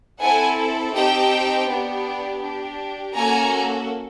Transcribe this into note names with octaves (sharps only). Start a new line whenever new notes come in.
C4 E4 A4 F#5 G#5
C4 D#4 G4 G5 A5
B3 D4 G4
D4 G4
A#3 C#4 F#4 A4 G#5 A#5